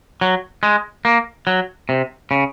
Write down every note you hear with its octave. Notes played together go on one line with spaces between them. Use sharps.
F#3
G#3
A#3
F#3
C3
C#3